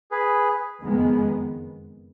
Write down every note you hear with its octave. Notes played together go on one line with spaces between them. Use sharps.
G#4 B4
F#1 F2 D#3 G#3 B3